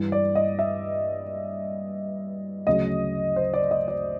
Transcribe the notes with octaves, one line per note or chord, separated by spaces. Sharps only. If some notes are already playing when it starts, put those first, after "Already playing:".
Already playing: G2 E3
D5
D#5
E5
D2 C#3 F#3 D#5
C5
D5
D#5
D5